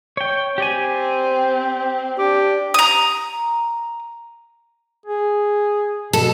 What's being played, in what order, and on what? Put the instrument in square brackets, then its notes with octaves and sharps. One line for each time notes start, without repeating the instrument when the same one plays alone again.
[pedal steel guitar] C#5 G5
[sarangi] C4 [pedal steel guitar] G4 D5 G#5
[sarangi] D4 [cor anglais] G4
[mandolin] A#5 D#6
[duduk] G#4
[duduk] B2 [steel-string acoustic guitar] A4